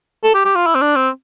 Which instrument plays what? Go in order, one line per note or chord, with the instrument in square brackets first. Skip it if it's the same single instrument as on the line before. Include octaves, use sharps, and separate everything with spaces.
[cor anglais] A4
G4
G4
F4
E4
C4
D4
C4